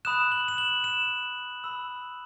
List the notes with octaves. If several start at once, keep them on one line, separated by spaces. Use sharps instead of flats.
B5 D#6 F#6 E7
F#7
E7
F#7
E7
B5 E6